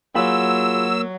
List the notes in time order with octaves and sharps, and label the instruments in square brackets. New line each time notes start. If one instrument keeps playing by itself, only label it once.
[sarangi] F#3 [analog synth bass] A#3 [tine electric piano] F4 G#4 B5 [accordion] E6